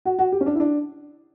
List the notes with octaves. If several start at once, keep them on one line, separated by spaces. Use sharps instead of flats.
F#4
F#4
G4
C#4
D4
E4
D4